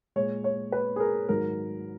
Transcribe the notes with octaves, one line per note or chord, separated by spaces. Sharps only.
A#2 G#3 C#5
C#5
B4
G#4
A#4
G#2 D#3 F#3 A#4